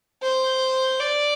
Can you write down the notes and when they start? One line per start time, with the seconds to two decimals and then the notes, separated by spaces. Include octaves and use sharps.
0.23 C5
0.99 D5